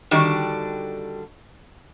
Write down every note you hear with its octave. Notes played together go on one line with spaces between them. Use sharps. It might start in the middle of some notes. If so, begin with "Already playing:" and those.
D3 D#3 G3 D4 F#4